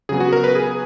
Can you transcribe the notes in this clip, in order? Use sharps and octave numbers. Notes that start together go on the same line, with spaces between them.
C#3 F#3 B3 G#4
F#4
A#4
B4
G#4